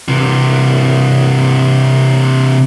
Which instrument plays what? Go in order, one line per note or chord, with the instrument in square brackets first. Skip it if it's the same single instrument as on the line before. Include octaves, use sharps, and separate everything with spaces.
[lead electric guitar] C3 E3